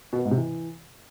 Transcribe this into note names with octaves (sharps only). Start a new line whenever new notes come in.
B2
B3
G#2
C3
E3